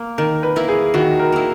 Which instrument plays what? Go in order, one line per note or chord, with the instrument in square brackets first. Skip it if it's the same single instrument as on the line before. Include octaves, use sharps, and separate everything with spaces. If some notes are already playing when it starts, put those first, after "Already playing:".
Already playing: [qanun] A#3
[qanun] D#3 [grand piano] A#4
[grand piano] B4
[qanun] A#3 E4
[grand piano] G#4
[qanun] D#3 [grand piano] F#4
[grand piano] A#4
[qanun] A#3 E4